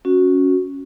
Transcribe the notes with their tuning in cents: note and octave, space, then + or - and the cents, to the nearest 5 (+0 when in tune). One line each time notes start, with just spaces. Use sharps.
C#4 +0 F#4 -10